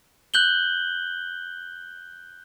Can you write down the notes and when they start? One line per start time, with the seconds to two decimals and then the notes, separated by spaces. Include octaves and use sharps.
0.34 F#6 G6 F#7 G7